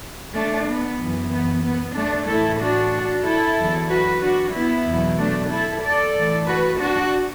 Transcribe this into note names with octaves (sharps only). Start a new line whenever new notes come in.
A3 D4
B3
F#2 E3
B3
B3
A3 D4
A2 E3 E4 A4
D4 F#4
E4 A4
E2 D3 F#3
F#4 B4
D4 F#4
B3 E4
E2 B2 F#3
A3 D4
E4 A4
A4 D5
A2 E3
F#4 B4
D4 F#4